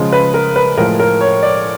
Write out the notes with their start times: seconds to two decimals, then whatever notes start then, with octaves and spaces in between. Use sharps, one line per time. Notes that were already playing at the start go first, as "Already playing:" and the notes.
Already playing: C#3 F3 G#3
0.12 B4
0.34 A#4
0.56 B4
0.78 A2 F3 G#3 A#4
0.99 A#4
1.21 C#5
1.43 D5